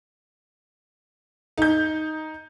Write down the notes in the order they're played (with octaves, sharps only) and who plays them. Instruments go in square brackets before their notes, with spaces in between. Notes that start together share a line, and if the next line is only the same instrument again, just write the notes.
[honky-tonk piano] D#4 G6